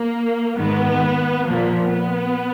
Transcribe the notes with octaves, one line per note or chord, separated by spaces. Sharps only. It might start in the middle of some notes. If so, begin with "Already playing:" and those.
Already playing: A#3
G#2 D#3 B3
A#2 F3 A#3
B3